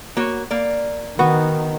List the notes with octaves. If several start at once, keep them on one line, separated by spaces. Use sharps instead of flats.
A#3 F#4 C#5
A#3 D5
D#3 B3 F#4